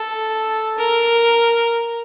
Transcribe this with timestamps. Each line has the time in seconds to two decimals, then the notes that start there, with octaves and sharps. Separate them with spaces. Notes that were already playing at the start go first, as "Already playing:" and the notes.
Already playing: A4
0.78 A#4